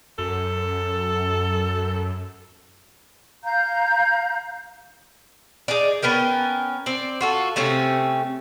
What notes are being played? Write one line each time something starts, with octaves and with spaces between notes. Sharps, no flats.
F#2 A4
F5 A#5 G6
D#4 G#4 D5
B3 C#4 A#4 G5
C4 D5
F4 F#4 A4
C3 A3 C4 C#4